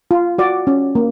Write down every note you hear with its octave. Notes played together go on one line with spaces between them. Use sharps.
F4
F#4 D5
C#4
A#3